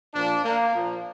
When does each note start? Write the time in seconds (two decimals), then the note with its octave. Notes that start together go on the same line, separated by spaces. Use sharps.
0.14 A#2 F3 D4
0.45 A#3
0.75 A#2 F3